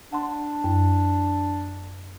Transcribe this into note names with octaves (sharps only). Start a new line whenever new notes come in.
D4 F#5 C6
F#2